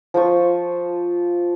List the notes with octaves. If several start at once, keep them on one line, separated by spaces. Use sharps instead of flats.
F3 F4 C5 C#6